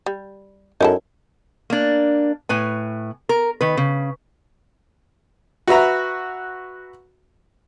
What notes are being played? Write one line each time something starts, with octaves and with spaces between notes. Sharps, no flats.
G3
F#2 D#4 E4 A4
A#3 D4
A2 B4 G#5
A#4
D#3 B4
C#3
F#4 B4 E5 A#5